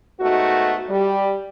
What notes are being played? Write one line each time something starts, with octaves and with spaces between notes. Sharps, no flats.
G#2 A3 B3 D#4 F#4
G3